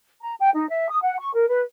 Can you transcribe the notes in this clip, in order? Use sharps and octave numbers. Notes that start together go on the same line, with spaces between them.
A#5
G5
D#4
E5
D#6
F#5
C#6
A#4
B4